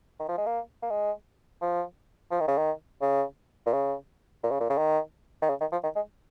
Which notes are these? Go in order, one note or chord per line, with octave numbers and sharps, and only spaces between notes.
D#3
F3
G#3
A#3
A#3
G#3
F3
F3
D#3
C#3
D#3
C#3
A#2
C#3
A#2
C#3
A#2
C#3
D#3
D#3
C#3
D#3
F3
D#3
G#3